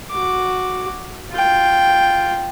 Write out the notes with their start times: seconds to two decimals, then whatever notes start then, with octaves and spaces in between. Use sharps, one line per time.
0.11 F#4 D6
1.32 F4 G5